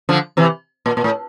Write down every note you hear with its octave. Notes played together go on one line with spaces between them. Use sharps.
D3 F3
C3 E3
A#2
A#2
A2